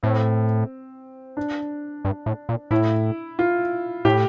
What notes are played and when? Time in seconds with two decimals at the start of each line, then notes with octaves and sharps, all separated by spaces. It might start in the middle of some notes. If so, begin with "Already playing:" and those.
0.03 A2 C4
1.37 D4
2.05 G2
2.26 A2
2.49 A#2
2.71 A2 E4
3.39 F4
4.05 A2 G4